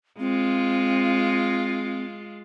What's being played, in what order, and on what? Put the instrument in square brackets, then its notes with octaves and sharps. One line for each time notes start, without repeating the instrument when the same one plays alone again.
[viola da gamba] G#3 F4 [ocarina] C4